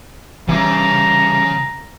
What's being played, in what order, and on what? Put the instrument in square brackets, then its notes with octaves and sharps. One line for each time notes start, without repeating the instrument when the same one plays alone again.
[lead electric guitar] C#3 [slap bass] E3 G3 [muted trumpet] A#5